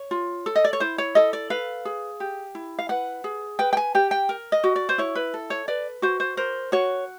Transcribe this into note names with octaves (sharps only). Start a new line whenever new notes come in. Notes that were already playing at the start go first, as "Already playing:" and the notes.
Already playing: C#5
F4
A4
D#5
D5
C#5
E4 C5
C#5
A4 D#5
D5
B4 F5
G#4
G4
E4
F5
B4 F#5
G#4
B4 G5
G5
G#5
G4 G5
G5
A#4
D#5
F#4
D5
C5
E4 C#5
B4
A4
C#5
B4 D5
F#4 C5
C5
A#4 C5
F#4 C#5